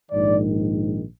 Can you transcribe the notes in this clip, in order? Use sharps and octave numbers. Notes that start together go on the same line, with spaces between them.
A#1 G#2 D#3 D5